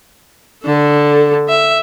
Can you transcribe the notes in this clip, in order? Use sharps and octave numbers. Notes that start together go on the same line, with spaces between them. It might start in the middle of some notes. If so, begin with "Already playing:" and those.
D3 A4
E5